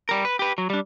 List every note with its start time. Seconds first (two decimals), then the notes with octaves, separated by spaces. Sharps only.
0.09 G3 A#4
0.25 B4
0.39 G4 B4
0.58 F#3
0.70 G3 D4